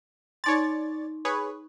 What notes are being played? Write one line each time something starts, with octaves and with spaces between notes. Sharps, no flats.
D#4 C#5 D5 C6 A6
G#4 B4 C#5